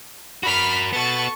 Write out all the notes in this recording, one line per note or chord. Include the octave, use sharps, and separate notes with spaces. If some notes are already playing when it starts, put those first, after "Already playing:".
F#4 A#4 B5 F6 B6
B3 F#4 A4 C#6 A6